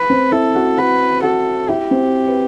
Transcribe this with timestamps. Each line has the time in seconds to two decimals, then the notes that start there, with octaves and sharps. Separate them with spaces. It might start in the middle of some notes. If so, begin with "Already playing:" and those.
Already playing: B4
0.10 C4 C5
0.32 E4 A4 E5
0.55 F#4 F#5
0.77 F#4 B4 F#5
1.22 F#4 A4 F#5
1.68 E4 G4 E5
1.91 C4 C5
2.28 B4